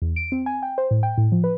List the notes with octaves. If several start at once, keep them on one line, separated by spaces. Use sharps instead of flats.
E2
D7
C4
G#5
G5
C5
A2
G5
A2
F3
B4